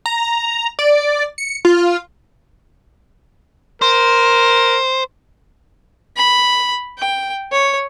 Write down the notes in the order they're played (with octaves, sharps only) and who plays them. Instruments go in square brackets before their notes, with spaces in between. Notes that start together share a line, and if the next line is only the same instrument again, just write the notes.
[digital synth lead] A#5
D5
C#7
F4
[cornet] A#4 [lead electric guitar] C5
[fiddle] B5
G5
C#5